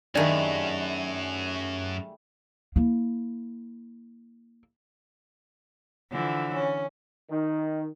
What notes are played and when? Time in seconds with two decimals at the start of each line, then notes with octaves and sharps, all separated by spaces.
0.15 F#2 D#3 G3 A3 D4 G#4 G#5
2.76 A#3 E4
6.11 D3 E3 F3
6.54 C#4
7.31 D#3